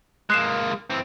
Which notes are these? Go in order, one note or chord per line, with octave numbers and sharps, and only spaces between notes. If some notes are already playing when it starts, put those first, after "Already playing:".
G#3 A#3 F#6 C7 E7
E3 C4